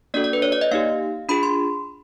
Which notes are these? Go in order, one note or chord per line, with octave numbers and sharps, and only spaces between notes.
A#3 D4 F#4 A4 D5
D5
B4
C#5
D5
D#5
A#3 D#4 G4 F5
D4 F4 G#4 B5
C6